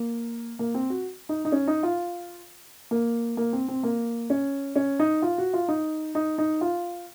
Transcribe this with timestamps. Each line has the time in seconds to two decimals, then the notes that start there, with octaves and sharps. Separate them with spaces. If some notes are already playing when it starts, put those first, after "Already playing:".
Already playing: A#3
0.59 A#3
0.75 C4
0.90 F#4
1.29 D#4
1.45 D#4
1.52 C#4
1.68 D#4
1.83 F4
2.91 A#3
3.37 A#3
3.53 C4
3.68 C4
3.83 A#3
4.30 C#4
4.76 C#4
4.99 D#4
5.22 F4
5.38 F#4
5.53 F4
5.68 D#4
6.15 D#4
6.38 D#4
6.61 F4